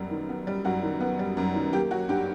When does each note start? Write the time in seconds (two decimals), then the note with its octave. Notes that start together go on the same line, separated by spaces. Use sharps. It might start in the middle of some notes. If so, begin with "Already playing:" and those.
Already playing: F#2 G3 B3
0.11 D#3
0.29 B3
0.47 G3
0.65 F#2 F#4
0.83 D#3
1.00 B3
1.19 G3
1.37 F#2
1.55 D#3
1.73 A#3 G4
1.91 F#3 F#4
2.09 G2 G4